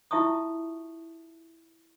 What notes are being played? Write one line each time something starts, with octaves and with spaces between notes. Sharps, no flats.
E4 F4 E5 A5 C#6 D#6